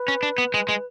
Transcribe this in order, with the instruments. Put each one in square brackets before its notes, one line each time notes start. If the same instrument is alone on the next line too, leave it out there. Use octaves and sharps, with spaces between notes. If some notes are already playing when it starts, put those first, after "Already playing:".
Already playing: [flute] B4
[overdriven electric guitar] C#4
D4
B3
G#3
G#3